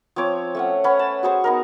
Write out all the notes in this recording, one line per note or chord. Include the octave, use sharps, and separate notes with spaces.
F3 C4 C#5 D6
A3 C#4 F#5
C#4 B4 F#5
A5
F#4 G#4 C5 C#6
B3 D#4 A#4